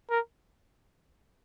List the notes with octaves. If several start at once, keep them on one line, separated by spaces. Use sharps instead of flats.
A#4